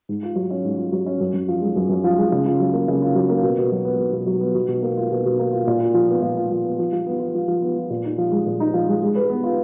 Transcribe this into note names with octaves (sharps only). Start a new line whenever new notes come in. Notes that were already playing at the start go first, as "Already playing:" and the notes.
G#2
F4
F#3
C#4
G#2
F4
F#3
C#4
F#2
F#2
F3
G#3
F#2
F#2
F3
G#3
C#3
F4
F#3
A#3
C#3
F4
F#3
A#3
B2
B2
F#3
B3
B2
B2
F#3
B3
B2
B2
A#3
F4
B2
B2
A#3
F4
A#2
F4
F3
B3
A#2
F4
F3
B3
F3
F3
B3
F4
F3
F3
B3
F4
A#2
D#4
F3
G#3
A#2
D#4
F3
G#3
G#3
B4
B3
F4